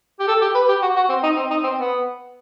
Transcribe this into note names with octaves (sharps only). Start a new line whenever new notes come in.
G4
A4
G4
B4
G4
F#4
F#4
C4
D#4
C4
D#4
C4
B3